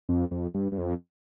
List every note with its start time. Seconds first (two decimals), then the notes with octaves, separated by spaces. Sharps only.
0.09 F2
0.31 F2
0.54 G2
0.72 G2
0.78 F2